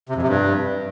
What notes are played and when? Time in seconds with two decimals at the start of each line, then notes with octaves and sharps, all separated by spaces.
0.09 C3
0.15 F2
0.22 C3
0.28 G2